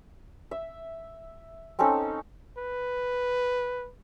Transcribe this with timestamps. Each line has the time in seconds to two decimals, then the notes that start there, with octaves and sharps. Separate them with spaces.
0.51 E5
1.79 C4 C#4 D#4 A4
2.58 B4